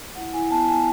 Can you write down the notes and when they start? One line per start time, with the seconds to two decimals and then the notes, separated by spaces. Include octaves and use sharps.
0.15 E4 F#5
0.33 E4 G#5
0.51 B3 A5
0.69 B3 G#5